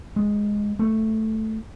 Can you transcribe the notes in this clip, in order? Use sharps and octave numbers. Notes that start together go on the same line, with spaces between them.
G#3
A3